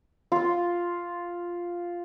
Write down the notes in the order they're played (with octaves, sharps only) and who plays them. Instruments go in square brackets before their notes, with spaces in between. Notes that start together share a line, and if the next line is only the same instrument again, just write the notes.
[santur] F4 C6